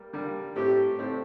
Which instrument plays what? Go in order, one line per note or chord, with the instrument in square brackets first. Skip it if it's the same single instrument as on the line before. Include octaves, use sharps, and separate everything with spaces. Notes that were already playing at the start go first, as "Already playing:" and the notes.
Already playing: [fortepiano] G3 A#3
D3 G3 A#3
[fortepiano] A2 A3 C4 [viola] G4
[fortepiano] A2 A3 C4